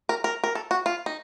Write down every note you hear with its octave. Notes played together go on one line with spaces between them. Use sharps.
A#4
A#4
A#4
A4
F#4
F4
D#4